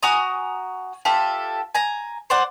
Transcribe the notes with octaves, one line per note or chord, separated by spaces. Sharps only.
F#4 G#5 A#5 D#6
F4 G4 A4 E5
G#5 A#5
C5 D5 F#5